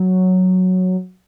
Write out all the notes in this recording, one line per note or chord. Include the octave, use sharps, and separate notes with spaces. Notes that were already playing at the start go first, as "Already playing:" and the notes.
Already playing: F#3